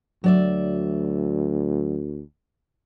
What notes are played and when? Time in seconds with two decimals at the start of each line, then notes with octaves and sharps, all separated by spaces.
0.24 D2 F#3 D5 E5